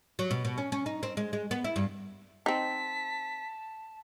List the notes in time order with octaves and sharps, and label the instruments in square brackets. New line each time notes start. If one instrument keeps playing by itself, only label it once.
[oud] F#3
B2
B2
C#4
C#4
D#4
C4
G#3
G#3
B3
E4
G2
[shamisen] C4 D#4 [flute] A5 [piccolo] B6